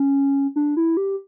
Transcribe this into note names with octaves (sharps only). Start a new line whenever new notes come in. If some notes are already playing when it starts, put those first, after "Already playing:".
Already playing: C#4
D4
E4
G4